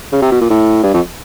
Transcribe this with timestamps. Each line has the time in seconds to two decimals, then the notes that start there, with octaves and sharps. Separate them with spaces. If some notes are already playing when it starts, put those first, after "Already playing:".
0.12 C#3
0.22 C3
0.32 B2
0.40 A#2
0.50 A2
0.83 G2
0.94 F2